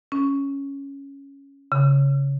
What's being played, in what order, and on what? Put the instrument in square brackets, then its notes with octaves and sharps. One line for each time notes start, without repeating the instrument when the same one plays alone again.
[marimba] C#4
C#3